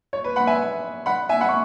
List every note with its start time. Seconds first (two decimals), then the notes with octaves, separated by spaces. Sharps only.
0.13 C#5
0.24 B4
0.36 F#5 B5
0.47 E5 G#5
1.06 F#5 B5
1.29 E5 G#5
1.41 F#5 B5
1.48 C#6